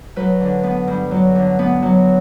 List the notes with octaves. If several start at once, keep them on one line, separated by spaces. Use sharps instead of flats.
F#3 B4
D3
B3
G2
F#3
D3
B3
F#3